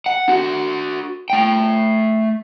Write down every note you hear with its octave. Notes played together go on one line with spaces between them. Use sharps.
F#5
D4 F#4
A3 G5